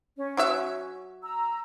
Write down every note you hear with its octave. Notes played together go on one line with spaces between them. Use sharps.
C#4
F#3 F#4 E5
A#5 E6